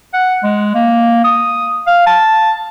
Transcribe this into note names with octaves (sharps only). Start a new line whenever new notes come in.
F#5
G#3
A#3
D#6
F5
A5